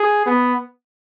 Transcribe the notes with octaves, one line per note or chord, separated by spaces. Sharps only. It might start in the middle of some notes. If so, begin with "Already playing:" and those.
Already playing: G#4
B3